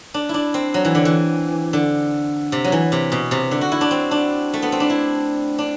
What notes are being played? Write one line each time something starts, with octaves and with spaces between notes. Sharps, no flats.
D4
D4 E4
C4
F#3
E3
D3
E3
D3
C3
F#3
E3
C3
B2
C3
D3
F#4
E4
D4
C4
D4
A3
B3
C4
D4
E4
D4